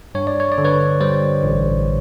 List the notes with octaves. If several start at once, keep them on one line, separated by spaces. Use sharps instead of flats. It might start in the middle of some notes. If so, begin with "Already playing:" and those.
G2 C#5
D5
C#5
D5
D3
B4 C#5
G3 C5 D5
A1